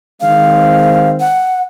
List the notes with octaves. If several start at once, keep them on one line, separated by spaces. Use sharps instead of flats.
D#3 G#3 C4 F5
F#5